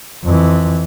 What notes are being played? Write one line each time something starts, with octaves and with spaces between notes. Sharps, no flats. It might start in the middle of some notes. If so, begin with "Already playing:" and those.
F2 E3